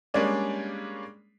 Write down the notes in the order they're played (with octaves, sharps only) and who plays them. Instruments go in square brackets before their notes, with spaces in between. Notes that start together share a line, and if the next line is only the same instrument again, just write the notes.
[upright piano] G3 G#3 A#3 C#4 D4